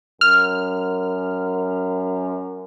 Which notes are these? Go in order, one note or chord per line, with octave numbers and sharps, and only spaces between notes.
F#2 F6